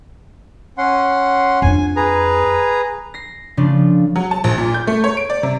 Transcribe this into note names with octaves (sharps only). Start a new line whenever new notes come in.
C#4 F#5 C6
F2 D4 G#5
G#4 B4 A#5
A#6 C7
C#3 F3 A3 D4 F4
F#3
A5
A#1
A#2
G6
A3
C#5
D7
D5
C3